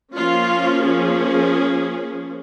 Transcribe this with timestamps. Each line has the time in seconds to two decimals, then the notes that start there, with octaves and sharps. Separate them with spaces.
0.15 F3 A#3 C#4 F4
0.83 G#4